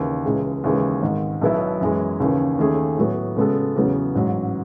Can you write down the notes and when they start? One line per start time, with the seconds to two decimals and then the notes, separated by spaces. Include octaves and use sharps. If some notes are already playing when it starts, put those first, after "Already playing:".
Already playing: D#2 C#3 E3
0.25 C#2 C#3 E3 G#3
0.64 D#2 C#3 E3 G#3
1.02 G#1 G#2 D#3
1.41 B1 B2 F#3 B3 E4
1.81 F#2 E3 G#3
2.20 D#2 C#3 E3
2.59 D#2 D#3 A3 C#4 G#4
2.98 A2 F#3 B3
3.36 C#3 G#3 B3 F#4 A4
3.76 E2 C#3 F#3 B3
4.15 A1 G#2 F#3